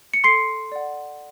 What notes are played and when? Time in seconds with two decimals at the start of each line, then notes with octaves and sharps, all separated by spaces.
0.14 C#7
0.24 A4 C6 C7
0.72 D5 F#5